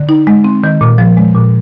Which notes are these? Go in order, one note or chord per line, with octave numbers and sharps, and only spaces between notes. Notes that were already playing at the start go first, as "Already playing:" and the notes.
Already playing: D3
D#4
G#3
C4
D#3
A#2
F3
G#3
A#2